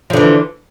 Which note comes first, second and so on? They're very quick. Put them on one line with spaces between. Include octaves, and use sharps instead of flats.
F3 D3 E3